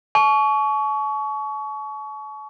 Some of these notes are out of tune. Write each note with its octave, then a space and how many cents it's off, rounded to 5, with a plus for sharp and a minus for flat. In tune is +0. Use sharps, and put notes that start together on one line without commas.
A5 -45 C#6 +25